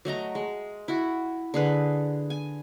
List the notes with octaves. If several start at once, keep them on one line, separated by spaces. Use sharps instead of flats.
F#3 A3 D#5 A#5
G#3
E4 F#4
D3 G#4 B4
G#5